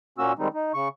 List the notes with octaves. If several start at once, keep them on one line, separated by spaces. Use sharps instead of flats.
A#2 A#3 C#4 F#4 E6
D#3 G3 G#3 C4 D#4
D#4
C#3 C#6